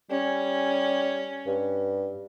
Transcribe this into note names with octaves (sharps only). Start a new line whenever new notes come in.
G3 C#4
G2